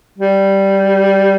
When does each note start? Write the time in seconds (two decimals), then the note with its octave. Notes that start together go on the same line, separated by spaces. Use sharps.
0.18 G3